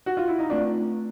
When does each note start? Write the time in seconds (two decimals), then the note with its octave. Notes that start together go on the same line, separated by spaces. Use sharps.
0.06 F#4
0.17 F4
0.28 E4
0.39 D#4
0.50 A3 C4 D4 F4